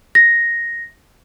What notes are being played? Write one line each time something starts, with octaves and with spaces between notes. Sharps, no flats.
A#6